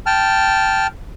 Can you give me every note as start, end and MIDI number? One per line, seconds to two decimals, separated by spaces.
0.06 0.87 79
0.06 0.87 81
0.06 0.87 89